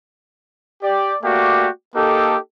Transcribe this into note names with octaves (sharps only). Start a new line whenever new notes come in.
G4 D5
A3 A#3 F#4 G4 D5
A#3 D#4 G4 A4